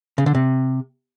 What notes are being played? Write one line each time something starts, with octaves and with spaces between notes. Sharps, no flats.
C#3
D3
C3